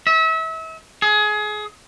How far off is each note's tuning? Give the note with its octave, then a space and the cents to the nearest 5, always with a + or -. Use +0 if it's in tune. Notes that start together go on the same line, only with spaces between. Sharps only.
E5 -35
G#4 +25